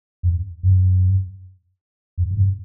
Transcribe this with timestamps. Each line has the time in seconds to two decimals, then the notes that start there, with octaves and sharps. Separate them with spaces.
0.23 F2
0.63 F#2
2.18 F2
2.31 A2
2.37 F#2